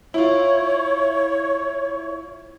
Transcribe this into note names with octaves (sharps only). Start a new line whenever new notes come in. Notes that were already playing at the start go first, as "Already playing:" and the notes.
E4 F4 C#5